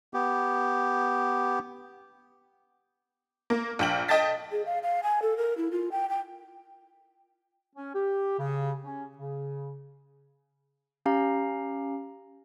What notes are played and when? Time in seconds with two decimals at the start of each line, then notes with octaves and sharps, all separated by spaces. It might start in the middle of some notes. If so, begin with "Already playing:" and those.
0.14 B3 G4
3.50 A#3
3.79 A#1 G5 F#7
4.08 D#5 G5 A5 A6 B6
4.52 G#4
4.66 F5
4.83 F5
5.03 G#5
5.22 A4
5.37 A#4
5.57 E4
5.72 F4
5.92 G5
6.09 G5
7.76 C#4
7.94 G4
8.39 C#3
8.84 C#4
9.18 C#3
11.06 C#4 G4 F5 A#5